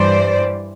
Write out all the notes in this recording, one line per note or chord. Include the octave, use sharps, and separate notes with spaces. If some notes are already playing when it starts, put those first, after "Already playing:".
Already playing: G2 E3 G3 C5 D5